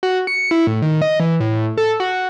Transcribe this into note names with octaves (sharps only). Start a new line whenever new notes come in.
F#4
C#7
E4
A2
D#3
D#5
E3
A2
A4
F#4